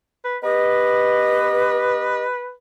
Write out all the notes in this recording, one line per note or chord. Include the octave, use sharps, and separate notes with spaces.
B4
B3 G4 B4 D#5